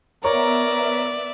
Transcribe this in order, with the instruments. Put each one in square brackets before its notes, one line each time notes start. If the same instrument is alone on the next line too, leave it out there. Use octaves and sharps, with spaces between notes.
[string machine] B3 E5 [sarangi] A#4 [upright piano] C#5 A#5 C#6 [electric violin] D5